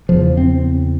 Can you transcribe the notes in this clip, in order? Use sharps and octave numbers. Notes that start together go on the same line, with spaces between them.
E2 C#3 F3
C4